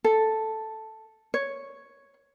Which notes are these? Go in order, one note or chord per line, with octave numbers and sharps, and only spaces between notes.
A4
C#5